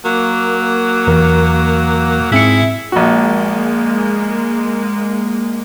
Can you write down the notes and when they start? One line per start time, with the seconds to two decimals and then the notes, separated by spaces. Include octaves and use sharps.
0.05 F#3 A#3
1.07 E2 E3 A#4
2.32 G#2 C4 E4 G#4 E5 C#7
2.92 A#1 G#3 A#3 F#4